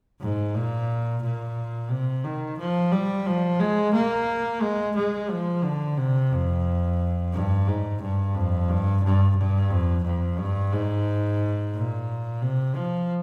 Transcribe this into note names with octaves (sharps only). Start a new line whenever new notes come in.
G#2
A#2
A#2
C3
D#3
F3
G3
F3
G#3
A#3
G#3
G#3
F3
D3
C3
F2
G2
G#2
G2
F2
G2
G2
G2
F2
F2
G2
G#2
A#2
C3
F3